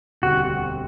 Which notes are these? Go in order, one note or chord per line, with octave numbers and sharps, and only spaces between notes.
E1 D2 D3 G3 C4 F#4